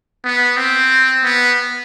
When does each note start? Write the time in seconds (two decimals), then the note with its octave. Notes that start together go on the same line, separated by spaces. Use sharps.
0.24 B3
0.57 C4
1.23 B3